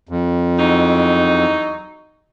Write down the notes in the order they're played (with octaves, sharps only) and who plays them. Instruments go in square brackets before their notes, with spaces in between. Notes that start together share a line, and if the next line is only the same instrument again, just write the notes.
[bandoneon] F2
[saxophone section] E2 F#3 D#4